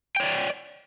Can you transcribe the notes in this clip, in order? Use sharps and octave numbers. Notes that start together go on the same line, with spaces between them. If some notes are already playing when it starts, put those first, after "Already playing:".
C#5 D5 G5